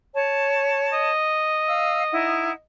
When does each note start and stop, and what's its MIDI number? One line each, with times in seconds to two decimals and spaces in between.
0.15 1.11 73
0.15 1.11 81
0.93 2.62 75
1.67 2.03 77
1.67 2.03 88
2.12 2.51 63
2.12 2.51 64
2.12 2.51 78